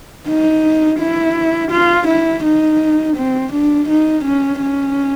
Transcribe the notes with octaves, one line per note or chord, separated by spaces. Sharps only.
D#4
E4
F4
E4
D#4
C4
D4
D#4
C#4
C#4